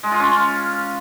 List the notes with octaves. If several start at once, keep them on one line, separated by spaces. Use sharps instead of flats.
G#3
F4
C#4